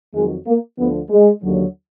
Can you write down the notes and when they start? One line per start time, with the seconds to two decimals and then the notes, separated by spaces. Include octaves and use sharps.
0.14 F2 D#3 F#3 G#3
0.46 A#3
0.78 D2 D3 F3 B3
1.10 G#3
1.43 D#2 D3 F#3